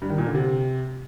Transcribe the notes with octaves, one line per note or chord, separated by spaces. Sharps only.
G2
D#3
A#2
D3
C3